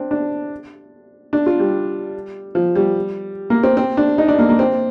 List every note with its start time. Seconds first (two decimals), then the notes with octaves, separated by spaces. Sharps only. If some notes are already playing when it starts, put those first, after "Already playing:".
Already playing: C4 D4
0.11 D4
1.33 D4
1.46 F4
1.60 G3
2.55 F3
2.75 G3
3.50 A#3
3.64 C4
3.77 C4
3.97 D4
4.18 D#4
4.28 D4
4.39 A#3
4.49 A#3
4.59 C4